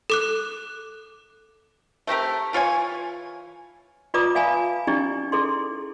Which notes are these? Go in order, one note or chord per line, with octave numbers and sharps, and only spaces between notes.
A4 D6 F#6
A3 C4 G4 A#4
E3 F4 C#5 G#5
F4 B4 D5 A#5 D6 D#6
D5 E5 F5 G#5 A5 B5
C#4 D#4 E4 G4 D5
E4 G#4 A4 D5 C6